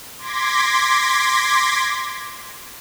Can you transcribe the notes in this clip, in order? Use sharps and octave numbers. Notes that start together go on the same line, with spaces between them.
C6 D6 G#6 A#6 B6